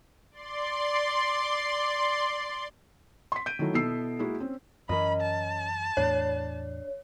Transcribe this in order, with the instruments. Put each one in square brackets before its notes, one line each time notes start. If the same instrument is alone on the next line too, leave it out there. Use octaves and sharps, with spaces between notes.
[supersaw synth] D5 C6
[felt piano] C6 B6
G6 D7 D#7
D#3 F#3 A3 E4 F#4
B2 B3 E4 A4 E6 C7
G#3 A#3 E4 F#4
C4 C#4
[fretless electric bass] F#2 E3 [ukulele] C#4 A#4 D#5 [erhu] B5
[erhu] A5
[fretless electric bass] E2 A2 [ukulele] D4 [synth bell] C#5